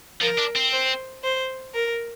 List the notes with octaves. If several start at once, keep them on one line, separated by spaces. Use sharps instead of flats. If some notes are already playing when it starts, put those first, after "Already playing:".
F3 A#4
D4
C4
C5
C5
A#4